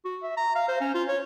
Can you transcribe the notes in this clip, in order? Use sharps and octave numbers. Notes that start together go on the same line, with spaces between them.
F#4
E5
A#5
F5
C5
C#4
F4
C#5